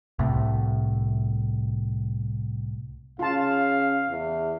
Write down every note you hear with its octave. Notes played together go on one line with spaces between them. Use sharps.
C2 A2
C#3 F4 F5 A5
E2